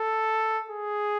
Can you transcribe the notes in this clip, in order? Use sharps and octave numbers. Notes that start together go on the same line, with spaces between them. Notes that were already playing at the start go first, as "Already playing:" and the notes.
Already playing: A4
G#4